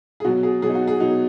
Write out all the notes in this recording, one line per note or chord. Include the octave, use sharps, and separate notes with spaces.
G#4
B2 F#3 F#4
G#4
B2 F#3 G#4
D#4
F#4
G#4
B2 F#3 D#4